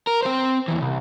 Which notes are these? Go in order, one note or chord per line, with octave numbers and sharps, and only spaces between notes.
A#4
C4 C5
D#2 E3
C2